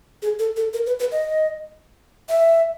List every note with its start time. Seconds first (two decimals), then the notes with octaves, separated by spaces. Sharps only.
0.22 G#4
0.39 A4
0.56 A4
0.73 A#4
0.87 B4
0.99 B4
1.12 D#5
2.29 E5